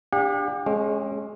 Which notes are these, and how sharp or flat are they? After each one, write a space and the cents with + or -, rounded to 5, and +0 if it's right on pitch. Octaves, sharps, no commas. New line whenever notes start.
D4 +5 G4 +35 F#5 -40
G#3 +20 C#4 -15